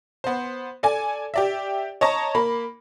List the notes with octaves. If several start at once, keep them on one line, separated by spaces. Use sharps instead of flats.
B3 C5
A4 D5 G#5
G4 D5 E5
C#5 D#5 A5 A#5 C#6
A#3 B5